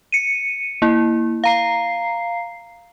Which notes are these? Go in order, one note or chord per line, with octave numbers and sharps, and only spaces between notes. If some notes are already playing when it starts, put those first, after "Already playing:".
C#7 D#7
A#3 E4
F5 A#5 C7